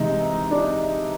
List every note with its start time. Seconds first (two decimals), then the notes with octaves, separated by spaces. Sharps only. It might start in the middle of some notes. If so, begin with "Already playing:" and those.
Already playing: C3 E3 G#3 D#4
0.51 D4